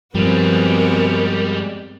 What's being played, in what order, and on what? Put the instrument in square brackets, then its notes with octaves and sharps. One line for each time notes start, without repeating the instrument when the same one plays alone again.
[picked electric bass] G2 F3 [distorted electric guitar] G3 G#3 [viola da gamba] B3 C4 F#4 [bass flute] A#4